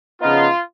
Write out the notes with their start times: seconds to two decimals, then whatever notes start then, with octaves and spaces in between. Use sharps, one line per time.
0.21 C#3 F3 B3 D#4 F4